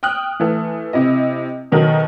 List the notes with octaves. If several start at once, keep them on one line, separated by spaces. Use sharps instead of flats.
G5 D#6 F6 F#6
E3 A3
C3 E4 D#5
B2 D#3 F#3 D#4 A4 A#4